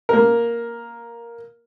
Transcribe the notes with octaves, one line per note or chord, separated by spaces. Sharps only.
A#3 A#4